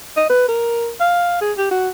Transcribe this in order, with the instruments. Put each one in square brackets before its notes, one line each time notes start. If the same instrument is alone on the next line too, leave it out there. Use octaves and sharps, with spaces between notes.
[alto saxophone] D#5
B4
A#4
F5
G#4
G4
F#4